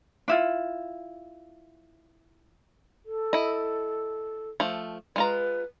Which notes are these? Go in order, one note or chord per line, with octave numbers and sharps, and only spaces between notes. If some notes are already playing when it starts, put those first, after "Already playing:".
D4 E4 F4
A4
E4 D#5
F3 A3
G#3 F4 B4 A#5